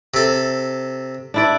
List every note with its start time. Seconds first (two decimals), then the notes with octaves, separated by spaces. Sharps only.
0.14 C3 A4
1.34 D4 E4 D5